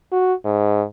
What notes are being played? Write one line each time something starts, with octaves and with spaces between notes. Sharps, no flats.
F#4
G#2